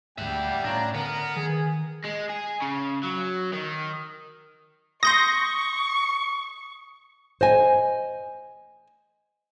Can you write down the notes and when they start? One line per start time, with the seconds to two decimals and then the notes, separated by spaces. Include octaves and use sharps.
0.18 D2 G#2 G3 E5 F#5 G5
0.64 A2 C#4 D4 F4 A#5
0.94 D3 B3 A#4
1.36 D#3 G#4
2.05 G#3
2.30 G#4
2.62 C#3
3.03 F#3
3.53 D#3
5.03 C6 C#6 D#6 G6 A#6
7.41 C5 D#5 G#5